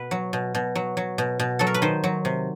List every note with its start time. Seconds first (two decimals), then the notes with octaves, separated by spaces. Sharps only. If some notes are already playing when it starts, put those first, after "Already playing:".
Already playing: B2 B4
0.11 F#3
0.33 B2
0.55 B2
0.75 F#3
0.97 F#3
1.18 B2
1.39 B2
1.59 F#3 A4
1.67 A#4
1.74 B4
1.82 D#3 C5
2.04 F#3
2.25 C3